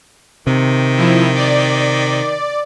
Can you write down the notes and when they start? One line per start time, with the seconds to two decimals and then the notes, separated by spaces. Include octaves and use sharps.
0.47 C3 D#3
0.97 F3 E4
1.35 D5